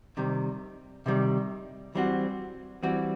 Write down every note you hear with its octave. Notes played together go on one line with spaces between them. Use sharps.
C3 D#3 G3
C3 D#3 G3
E3 G3 C4 F#4
E3 G3 C4 F#4